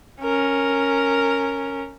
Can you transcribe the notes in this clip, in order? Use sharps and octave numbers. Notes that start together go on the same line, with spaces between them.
C#4 A#4